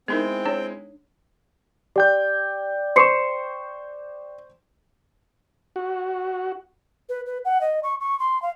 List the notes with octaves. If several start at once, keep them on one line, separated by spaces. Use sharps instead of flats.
G#3 B3 C4 D#4 E4 A#4 G5
D4 G#4 C#5
G4 D5 G5 G6
C5 C6 C#6 C7 C#7 E7
F#4
B4
B4
F#5
D#5
C#6
C#6
C6
F5